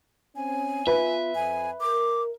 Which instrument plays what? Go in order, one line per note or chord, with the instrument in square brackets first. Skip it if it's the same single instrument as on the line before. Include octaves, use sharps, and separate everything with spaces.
[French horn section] C4 C#4 [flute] G#5
[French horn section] B3 F4 [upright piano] B4 [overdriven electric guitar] E5
[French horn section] F2 [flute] G#5
[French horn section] A#4 [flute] D6